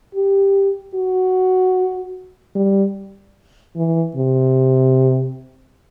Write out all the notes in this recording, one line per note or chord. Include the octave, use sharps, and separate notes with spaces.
G4
F#4
G3
E3
C3